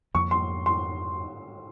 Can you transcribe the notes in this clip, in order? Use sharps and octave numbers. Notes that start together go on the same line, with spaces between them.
F2 C#3 F3 A#3 C#6
C6
C6